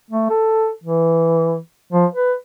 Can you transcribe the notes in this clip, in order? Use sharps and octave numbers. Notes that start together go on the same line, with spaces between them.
A3
A4
E3
F3
B4